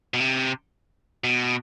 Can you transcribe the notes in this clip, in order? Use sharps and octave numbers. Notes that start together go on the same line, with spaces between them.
B2
C3
B2